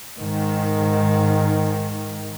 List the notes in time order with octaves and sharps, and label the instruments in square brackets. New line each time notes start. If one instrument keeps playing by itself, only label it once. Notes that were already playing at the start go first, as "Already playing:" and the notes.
[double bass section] G#2 D#3